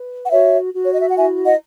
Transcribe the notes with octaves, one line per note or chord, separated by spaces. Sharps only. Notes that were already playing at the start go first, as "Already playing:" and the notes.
Already playing: B4
F#5
F#4 C#5 E5
F#4
C#5
D#5
E5
F#5
E4 E5 G#5
D#5 F#5